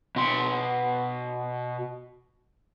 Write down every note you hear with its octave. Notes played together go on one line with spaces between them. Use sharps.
B2 C6